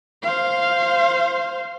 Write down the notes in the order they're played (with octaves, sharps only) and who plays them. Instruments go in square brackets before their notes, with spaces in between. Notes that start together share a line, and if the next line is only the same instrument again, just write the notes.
[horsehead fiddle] C5 F5